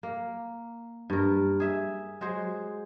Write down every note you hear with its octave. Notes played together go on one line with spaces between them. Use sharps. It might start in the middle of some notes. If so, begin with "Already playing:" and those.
A#3
G2 A#4
G#4 E5
F#3 G#3 G#4 C5